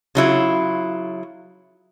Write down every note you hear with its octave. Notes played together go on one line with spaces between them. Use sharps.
C#3 F#3 E4 F4